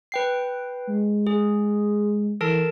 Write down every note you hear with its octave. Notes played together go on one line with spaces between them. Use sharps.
B4 G5 C7
G#3
G#4
E3 A4 A#4 A5